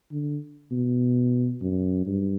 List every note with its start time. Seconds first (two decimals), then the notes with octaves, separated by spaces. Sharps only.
0.12 D3
0.72 B2
1.62 F#2
2.06 G2